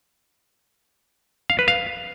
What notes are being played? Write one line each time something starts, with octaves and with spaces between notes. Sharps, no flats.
F5
B4
F5